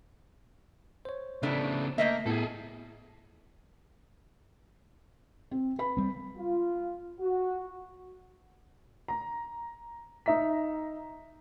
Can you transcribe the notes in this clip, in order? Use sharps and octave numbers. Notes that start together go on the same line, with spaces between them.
C5 C#5
A2 C#3 A3 B3 D4
A3 A#3 D#5 E5
A2 B3 E4 G#4 A4
C4
B4 B5
G3 C4
F4
F#4
A#5
D#4 E5 A#5 B6